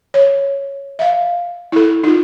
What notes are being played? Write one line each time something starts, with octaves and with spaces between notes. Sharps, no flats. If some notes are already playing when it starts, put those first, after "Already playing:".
C#5
E5 F5
E4 A4
D#4 F4